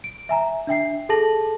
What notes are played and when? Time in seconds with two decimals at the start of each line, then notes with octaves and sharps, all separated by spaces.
0.04 D7
0.29 E5 G#5 A#5
0.67 D4 E5 G5 C7
1.09 G#4 A4 A5 A#6 F#7